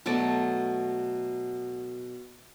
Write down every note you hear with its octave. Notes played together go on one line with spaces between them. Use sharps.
B2 F#3 A3 D5